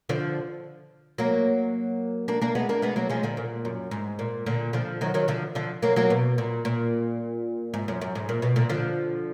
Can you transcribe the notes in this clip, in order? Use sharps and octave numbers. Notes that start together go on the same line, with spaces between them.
D3 F3
F#3 A#3
A#3 D4
A#3 D4
G#3 B3
A#3 D4
G#3 B3
F#3 A#3
F3 G#3
A#2 D3
A#2
F#2
G#2
A#2
A#2 D3
D3 F3
D#3 F#3
D#3 F#3
D3 F3
D3 F3
F#3 A#3
F#3 A#3
B2
A#2
A#2
G#2
F#2
F#2
G#2
A#2
B2
A#2 D3
D3 F3